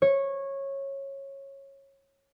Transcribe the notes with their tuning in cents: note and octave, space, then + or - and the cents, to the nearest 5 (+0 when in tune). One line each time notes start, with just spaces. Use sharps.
C#5 -15